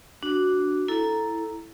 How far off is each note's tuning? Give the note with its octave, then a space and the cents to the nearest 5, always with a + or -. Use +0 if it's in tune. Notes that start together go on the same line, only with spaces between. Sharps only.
D4 -5 F#4 +0
E4 +0 A4 +0 A#5 +0